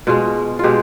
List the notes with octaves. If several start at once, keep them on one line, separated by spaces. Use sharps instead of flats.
B2 G#3 F4
B2 G#3 F4 G4